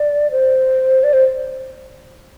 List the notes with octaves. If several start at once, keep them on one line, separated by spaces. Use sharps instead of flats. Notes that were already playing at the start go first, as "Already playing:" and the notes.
Already playing: D5
C5
D5
C5